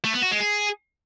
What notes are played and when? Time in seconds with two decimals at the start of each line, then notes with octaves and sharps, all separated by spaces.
0.05 A3
0.14 B3
0.23 F#4
0.32 G#3
0.40 G#4